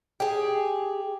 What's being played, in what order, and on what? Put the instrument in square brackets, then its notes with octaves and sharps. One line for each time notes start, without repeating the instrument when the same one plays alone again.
[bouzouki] G4 G#4